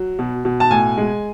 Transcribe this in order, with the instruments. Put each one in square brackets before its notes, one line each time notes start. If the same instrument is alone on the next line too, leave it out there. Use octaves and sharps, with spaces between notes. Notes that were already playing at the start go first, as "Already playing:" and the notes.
Already playing: [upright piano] F#3
B2
B2
A5
A2 G#5
G#3